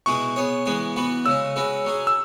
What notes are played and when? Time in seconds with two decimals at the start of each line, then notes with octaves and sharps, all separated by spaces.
0.06 B2 G#3 E4 G#4 C#6
0.36 B3 G#4 C#5
0.66 E3 G#3 B3 G#4
0.96 E3 B3 F#4 B4
1.25 C#3 G#3 C#4 E6
1.56 G#3 C#4 F#4 B4
1.85 F#3 C#4 G#4
2.07 E6